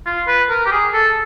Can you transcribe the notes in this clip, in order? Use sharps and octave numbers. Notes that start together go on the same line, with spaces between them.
F4
B4
A#4
G4
G#4
A4